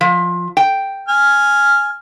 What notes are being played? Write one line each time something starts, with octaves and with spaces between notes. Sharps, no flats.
F3
G5
G#5 F6